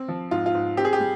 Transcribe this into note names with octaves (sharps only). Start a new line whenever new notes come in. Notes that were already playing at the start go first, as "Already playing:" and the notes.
Already playing: C4
F3
G#2 F4
F4
G#2
C4 G4
G#4
G4
G3